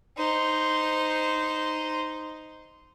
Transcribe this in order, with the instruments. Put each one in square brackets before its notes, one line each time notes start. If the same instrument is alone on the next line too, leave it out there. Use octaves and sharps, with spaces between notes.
[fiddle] D#4 C5